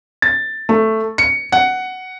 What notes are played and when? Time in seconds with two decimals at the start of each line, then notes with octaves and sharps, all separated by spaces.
0.22 A6
0.69 A3
1.18 C#7
1.52 F#5